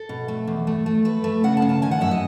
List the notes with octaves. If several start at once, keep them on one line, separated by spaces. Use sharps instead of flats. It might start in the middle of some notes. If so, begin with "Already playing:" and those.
Already playing: A4
B2
A3
E2
A3
A3
A3 B4
A3
C#3 F#5
A5
C#3
A5
D#3 G#5
F#5
F#2 E5
D#5